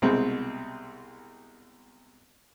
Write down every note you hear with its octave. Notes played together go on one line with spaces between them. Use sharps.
C2 B2 G#3 C4